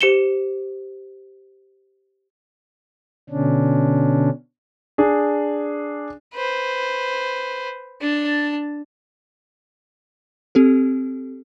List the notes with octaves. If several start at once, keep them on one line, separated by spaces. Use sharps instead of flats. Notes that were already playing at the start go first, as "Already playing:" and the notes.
G4 C5 C#7 E7 G7
B2 D3 C#4 D4
D4 G#4
B4 C5
D4 A5
C4 G4 A4